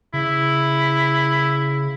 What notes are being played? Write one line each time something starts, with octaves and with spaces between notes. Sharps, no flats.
C#3 E4